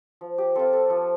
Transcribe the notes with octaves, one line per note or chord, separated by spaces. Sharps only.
F3
G4
C4 F4 A4
A4
F3